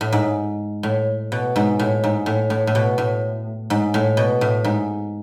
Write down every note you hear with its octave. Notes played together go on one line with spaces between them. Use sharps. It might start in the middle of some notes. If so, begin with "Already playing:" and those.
A2
G#2
A2
B2
G#2
A2
G#2
A2
A2
A2
B2
A2
G#2
A2
B2
A2
G#2